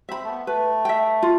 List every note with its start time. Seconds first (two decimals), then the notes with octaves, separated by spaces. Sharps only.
0.09 C4 E5 B5
0.24 A3
0.28 B3
0.47 A3 B4
0.85 E5 G5
1.23 F4